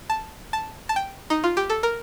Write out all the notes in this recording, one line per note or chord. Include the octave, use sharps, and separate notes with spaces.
A5
A5
A5
G5
D#4
F4
G4
A4
A#4